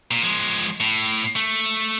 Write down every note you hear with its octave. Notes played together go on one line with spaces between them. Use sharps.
A#2
F3 G#3
A2
A3